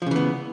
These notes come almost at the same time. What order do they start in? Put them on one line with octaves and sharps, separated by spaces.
F3 C#3 E3 B3